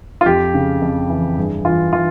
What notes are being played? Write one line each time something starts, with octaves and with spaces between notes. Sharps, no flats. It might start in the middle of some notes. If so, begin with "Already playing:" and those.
F4
F2 G4
C#3
F2
E3
G2 G#4
E3 F4
E3 F4